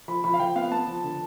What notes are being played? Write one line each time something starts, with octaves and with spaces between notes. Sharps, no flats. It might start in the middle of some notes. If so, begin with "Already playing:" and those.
F3 B5
F3 B5
F5
F3 G5
B3 F5
B3 A5
F3
D3